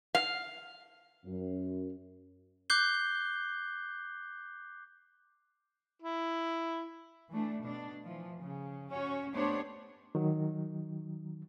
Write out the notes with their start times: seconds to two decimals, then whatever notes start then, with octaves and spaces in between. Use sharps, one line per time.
0.15 F5
1.25 F#2
2.70 D6 F#6 G6 C7 G7
6.02 E4
7.30 E3 A3 D4
7.64 B2 D4
8.05 E3 F3
8.38 C#3
8.90 C#4 F#4 C#5
9.32 A3 B3 D4 G4 C5 C#5
10.15 D#3 F#3